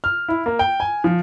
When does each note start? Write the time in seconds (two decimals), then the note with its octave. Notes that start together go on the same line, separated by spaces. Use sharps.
0.04 F6
0.28 E4
0.46 A#3
0.59 G5
0.80 G#5
1.04 F3